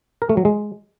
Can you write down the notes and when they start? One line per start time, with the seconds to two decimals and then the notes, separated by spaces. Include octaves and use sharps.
0.22 A#4
0.29 A3
0.37 F#3
0.45 G#3